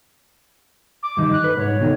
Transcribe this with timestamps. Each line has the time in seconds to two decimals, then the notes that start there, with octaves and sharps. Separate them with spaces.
1.03 D6
1.17 G2 D#3
1.32 F#6
1.44 B4
1.57 G#2 C#5
1.79 D2 B2 D#3